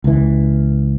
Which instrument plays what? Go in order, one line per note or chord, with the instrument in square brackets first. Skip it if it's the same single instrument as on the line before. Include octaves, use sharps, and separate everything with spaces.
[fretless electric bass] C#2 E3